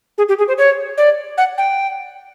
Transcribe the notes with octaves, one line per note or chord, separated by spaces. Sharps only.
G#4
G4
G#4
C5
C#5
D5
F#5
G5